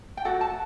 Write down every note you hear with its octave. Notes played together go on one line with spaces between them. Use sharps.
G5
F#4 A4 F#5
A5